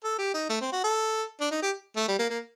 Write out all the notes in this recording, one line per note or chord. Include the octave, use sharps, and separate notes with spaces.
A4
G4
D#4
A3
C4
F#4
A4
D4
D#4
G4
A3
G3
A#3
A#3